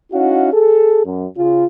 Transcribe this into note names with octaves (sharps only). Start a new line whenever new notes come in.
C#4 D#4 E4 F#4 F5 F#5
G#4 A4
F#2
C#3 F4